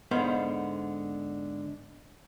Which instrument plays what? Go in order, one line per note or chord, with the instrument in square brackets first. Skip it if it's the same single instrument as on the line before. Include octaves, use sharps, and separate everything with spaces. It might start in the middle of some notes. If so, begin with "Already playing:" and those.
[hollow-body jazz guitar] G#2 D3 B3 C5 F5